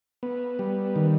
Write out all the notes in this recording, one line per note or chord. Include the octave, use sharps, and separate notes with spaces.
B3
G3
D#3